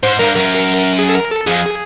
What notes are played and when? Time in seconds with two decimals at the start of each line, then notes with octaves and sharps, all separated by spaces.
0.03 G#2 C5
0.19 G2 A#4
0.35 F#2 A#4
0.99 G#4
1.09 A4
1.15 A#4
1.31 A4
1.46 F2 G#4